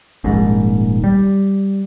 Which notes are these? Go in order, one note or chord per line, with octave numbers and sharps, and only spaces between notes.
D#1 A#1 G#2
G3